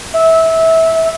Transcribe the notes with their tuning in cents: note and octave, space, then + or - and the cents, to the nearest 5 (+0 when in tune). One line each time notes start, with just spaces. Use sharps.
E5 -20